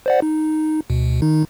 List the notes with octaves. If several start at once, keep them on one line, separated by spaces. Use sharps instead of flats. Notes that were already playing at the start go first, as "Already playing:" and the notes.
C5 D5 F#5
D#4
D2 B2
D#3 D#4